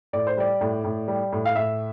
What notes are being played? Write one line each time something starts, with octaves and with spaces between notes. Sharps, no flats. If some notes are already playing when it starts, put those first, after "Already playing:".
A2 D5
C5
G3 D5
A2
A2
G3
A2
F5
A2 E5